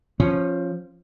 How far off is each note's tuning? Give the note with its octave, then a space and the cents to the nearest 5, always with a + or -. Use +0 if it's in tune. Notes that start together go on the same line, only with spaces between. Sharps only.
F3 +0 C#4 -20